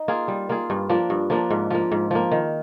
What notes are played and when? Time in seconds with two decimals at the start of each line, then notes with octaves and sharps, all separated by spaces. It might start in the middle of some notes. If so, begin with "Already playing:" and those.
Already playing: D#4
0.08 A#3 F4 G#4
0.28 G3
0.49 A#3 F4 G#4
0.70 G2
0.89 F3 A#3 D4
1.10 G2
1.30 F3 A#3 D4
1.50 G#2
1.70 F3 A#3
1.92 G#2
2.11 F3 A#3
2.31 D#3